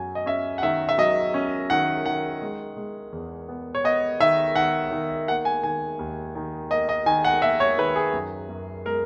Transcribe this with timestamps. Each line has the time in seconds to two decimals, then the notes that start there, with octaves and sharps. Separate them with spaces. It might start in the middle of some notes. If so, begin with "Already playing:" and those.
Already playing: F#2 F#3 G#5
0.15 D#5
0.26 C#4 E5
0.58 F#5
0.63 D#3 E5
0.89 E5
0.98 F#3 D#5
1.34 C#4
1.70 D#3 F#5
2.06 D#3 F#5
2.42 G#3
2.77 G#3
3.13 E2
3.49 B3
3.75 C#5
3.84 B3 D#5
4.20 D#3 E5
4.56 D#3 F#5
4.91 D#3
5.28 A#3 F#5
5.45 G#5
5.63 D#3 G#5
5.99 D#2
6.35 D#3
6.70 A#3 D#5
6.89 D#5
7.06 D#3 G#5
7.24 F#5
7.42 A#3 E5
7.60 C#5
7.78 D#3 B4
7.95 G#4
8.13 F#2
8.49 F#2
8.85 G#3 A#4